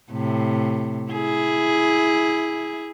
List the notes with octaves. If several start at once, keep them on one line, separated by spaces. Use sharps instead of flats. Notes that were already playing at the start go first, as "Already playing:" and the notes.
A2 C3
E4 G#4